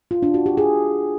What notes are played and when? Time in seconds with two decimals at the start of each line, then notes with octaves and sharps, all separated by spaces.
0.11 F4
0.23 D4
0.34 F#4
0.46 G4
0.57 G#4